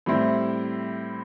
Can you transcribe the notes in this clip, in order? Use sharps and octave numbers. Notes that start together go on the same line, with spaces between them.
A2 G3 C4 E4